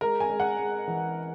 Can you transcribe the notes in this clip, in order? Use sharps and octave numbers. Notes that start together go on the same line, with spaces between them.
G#3 A#4
G#5
G#3
F#5
G#3
E3